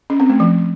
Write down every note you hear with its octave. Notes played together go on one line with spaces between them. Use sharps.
C#4
C4
A3
F3